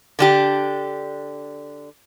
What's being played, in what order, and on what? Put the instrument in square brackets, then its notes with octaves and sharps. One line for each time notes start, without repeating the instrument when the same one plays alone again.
[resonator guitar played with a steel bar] D3 D4 G4